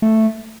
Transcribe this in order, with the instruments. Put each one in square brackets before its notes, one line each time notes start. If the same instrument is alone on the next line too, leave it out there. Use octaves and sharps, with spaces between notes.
[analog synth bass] A3